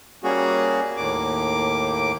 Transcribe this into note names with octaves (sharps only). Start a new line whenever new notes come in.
G3 A#3 C#4 F#4 G#4
D#2 A2 A#3 D6